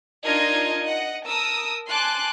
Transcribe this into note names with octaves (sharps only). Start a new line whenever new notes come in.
D4 D#4 F4 A#4 D#5 G#6
D#5 F#5
A#4 A5 D#6 E6
G#5 A5 C6 D6 F#6